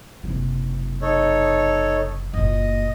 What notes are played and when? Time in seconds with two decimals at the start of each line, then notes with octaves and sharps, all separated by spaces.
0.23 F#1 C3
1.02 D#4 A4 C#5
2.34 F#1 A#2 D#5